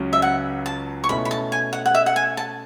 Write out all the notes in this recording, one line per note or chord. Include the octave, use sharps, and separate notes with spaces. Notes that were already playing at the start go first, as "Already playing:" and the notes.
Already playing: C#2 C#3 F#3 C#4
E5
F#5
A5
C#6
B2 A3 C#4 E4 B5
B5
A5
G#5
F#5
F#5
E5
F#5
G#5
A5